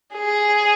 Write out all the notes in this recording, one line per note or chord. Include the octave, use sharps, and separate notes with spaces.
G#4